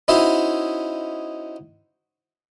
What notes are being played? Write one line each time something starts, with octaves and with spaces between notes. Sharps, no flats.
C#4 D#4 E4 F#4 C5 E5